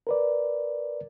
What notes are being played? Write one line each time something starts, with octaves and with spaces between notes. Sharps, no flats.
A#4 B4 D5